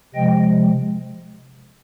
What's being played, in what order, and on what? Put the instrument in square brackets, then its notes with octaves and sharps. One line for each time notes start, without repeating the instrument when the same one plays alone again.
[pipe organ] C3 F3 G#3 D#5 G5